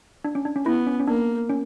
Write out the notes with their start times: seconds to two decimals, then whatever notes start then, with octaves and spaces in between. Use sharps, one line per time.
0.24 D4
0.35 C#4
0.45 D4
0.56 C#4
0.66 B3 E4
0.87 C#4
1.00 C#4
1.08 A#3 D4
1.50 C#4